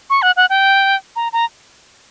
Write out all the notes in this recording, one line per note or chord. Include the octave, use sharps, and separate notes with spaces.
C#6
F#5
F#5
G5
A#5
A#5